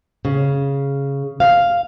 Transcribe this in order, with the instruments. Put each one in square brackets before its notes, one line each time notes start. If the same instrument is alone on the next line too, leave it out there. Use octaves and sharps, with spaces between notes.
[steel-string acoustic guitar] C#3
F5